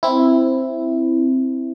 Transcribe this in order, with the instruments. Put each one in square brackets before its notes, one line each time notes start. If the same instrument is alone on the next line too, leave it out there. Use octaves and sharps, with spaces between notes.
[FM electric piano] C4 E4